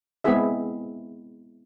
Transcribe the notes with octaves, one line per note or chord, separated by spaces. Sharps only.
G#3 B3 C4 E4 G#4 E5